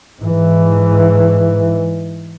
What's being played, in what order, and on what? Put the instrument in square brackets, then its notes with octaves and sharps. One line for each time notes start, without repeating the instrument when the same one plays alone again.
[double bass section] G#2 E3